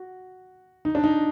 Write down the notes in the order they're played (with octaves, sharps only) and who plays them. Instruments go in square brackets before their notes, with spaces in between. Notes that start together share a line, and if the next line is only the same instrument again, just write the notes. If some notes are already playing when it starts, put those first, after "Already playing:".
Already playing: [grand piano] F#4
D#4
D4
D#4